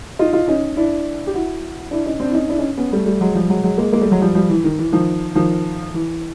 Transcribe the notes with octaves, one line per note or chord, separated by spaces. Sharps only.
D#4 F4
D#4 F4
C#4 D#4
D4 E4
G4
E4 F#4
D4 E4
C#4 D#4
C4 D4
E4
C#4 D#4
D4 E4
C#4 D#4
B3 C#4
G3 A3
G3 A3
F#3 G#3
F3 G3
F#3 G#3
F#3 G#3
G#3 A#3
G#3 A#3
G3 A3
F#3 G#3
F3 G3
F3 G3
E3
D#3
E3
D#3 F3
D#3 F3
E3